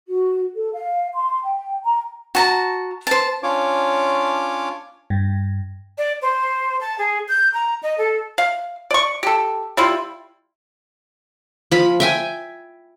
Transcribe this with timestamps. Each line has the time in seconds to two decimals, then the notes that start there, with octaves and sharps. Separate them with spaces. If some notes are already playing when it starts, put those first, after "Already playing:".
0.09 F#4
0.56 A4
0.73 F5
1.14 C6
1.43 G5
1.85 A#5
2.35 F#4 A5 A#5
3.07 C5 A5
3.43 C#4 D4 F4 C#5 D6
5.10 G2
5.98 D5
6.22 C5
6.81 A5
6.99 G#4
7.28 G6
7.54 A#5
7.83 D#5
7.98 A4
8.38 F5
8.91 D5 C#6
9.23 G4 A4
9.77 G3 E4 F4
11.72 F3 B5
12.00 E5 G5 G#5